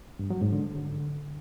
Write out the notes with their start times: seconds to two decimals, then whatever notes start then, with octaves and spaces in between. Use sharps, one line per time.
0.19 G2
0.30 F#3
0.42 G#2
0.53 D3